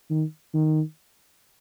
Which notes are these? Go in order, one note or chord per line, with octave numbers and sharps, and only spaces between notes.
D#3
D#3